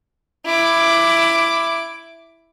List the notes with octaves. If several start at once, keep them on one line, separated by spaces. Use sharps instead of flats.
E4 D6